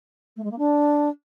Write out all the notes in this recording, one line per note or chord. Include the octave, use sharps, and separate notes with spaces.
A3
G#3
A#3
D4